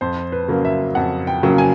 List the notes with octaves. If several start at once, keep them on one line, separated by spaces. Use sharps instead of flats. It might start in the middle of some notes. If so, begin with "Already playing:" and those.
F2 C5
B4
C#3 F#3 A#3
E5
F2 F#5
G5
C#3 F#3 A#3
G#5